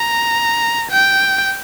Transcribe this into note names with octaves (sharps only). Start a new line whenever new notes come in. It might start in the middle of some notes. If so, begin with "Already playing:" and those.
Already playing: A#5
G5